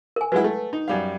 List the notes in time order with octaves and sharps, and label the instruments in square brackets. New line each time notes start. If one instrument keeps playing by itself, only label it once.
[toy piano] A#4 G#5
[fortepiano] F#3 G#3 E4 [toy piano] B4 F#5
[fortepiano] A3
D#4
F#2 G3 F5